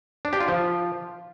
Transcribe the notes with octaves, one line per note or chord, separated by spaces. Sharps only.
D4
G4
F4
F3